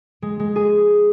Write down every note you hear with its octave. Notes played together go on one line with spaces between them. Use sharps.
G#3
G#3
G#4